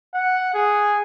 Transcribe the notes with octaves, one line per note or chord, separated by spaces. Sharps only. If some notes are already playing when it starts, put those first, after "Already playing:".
F#5
G#4